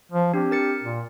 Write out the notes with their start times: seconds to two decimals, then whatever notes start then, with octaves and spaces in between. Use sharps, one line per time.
0.12 F3
0.34 C4 D4 G4
0.51 A#4 A6 C#7
0.83 A#2